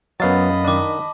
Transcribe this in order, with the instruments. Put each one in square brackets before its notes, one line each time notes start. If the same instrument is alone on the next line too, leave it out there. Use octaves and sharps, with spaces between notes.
[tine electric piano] F#2 F5 A6 [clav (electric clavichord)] F#3 B3 [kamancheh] D#5 B5
[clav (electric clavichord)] D#3 D4 [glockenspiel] A5 D6